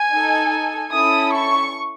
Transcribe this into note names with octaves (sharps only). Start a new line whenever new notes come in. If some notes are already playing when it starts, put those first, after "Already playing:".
Already playing: G#5
D#4 A4
C#4 E4 A4 D#6
C#6